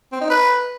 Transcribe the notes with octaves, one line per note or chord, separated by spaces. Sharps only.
C4
D#4
B4